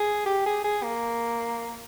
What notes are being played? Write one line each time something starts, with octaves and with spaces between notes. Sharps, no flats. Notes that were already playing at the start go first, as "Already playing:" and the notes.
Already playing: G#4
G4
G#4
G#4
A#3